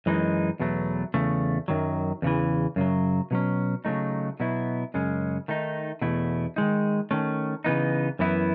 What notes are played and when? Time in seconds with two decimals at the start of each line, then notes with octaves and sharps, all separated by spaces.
0.06 F#2 E3 G#3 D#4
0.59 E2 B2 F#3 A3
1.14 E2 C#3 A3
1.68 F#2 D#3 F#3
2.22 E2 C#3 E3
2.76 F#2 C#3 F#3
3.31 B2 F#3 C#4
3.85 C#3 F#3 A3 D#4
4.40 B2 F#3 B3 E4
4.94 F#2 C#3 G#3 C#4
5.48 D#3 A3 D#4
6.01 E2 B2 A3 E4
6.56 D#3 G#3 D#4
7.11 D#3 A3 C#4
7.64 C#3 E3 B3 D#4
8.19 F#2 E3 B3 E4